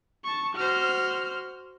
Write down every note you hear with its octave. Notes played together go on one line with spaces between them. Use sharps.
A5 C#6
F#4 C5 F6